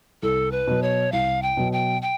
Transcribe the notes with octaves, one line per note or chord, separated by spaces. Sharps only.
C2 A4
B4
B2 F#3
C#5
C2 F5
G5
B2 F#3
G5
G5